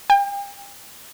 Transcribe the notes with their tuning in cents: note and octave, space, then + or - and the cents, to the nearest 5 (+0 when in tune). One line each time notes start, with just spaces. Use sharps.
G5 +40